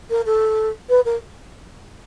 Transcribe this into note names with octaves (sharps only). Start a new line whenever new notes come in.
A#4
A4
B4
A#4